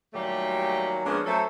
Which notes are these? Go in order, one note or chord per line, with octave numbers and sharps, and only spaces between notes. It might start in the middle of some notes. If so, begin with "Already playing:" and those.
A#2 D#3 F#3 G3 A3 G4
F3 G#3 A#3 B3 C#4 D4
F#3 A3 C#4 A4 C5 E5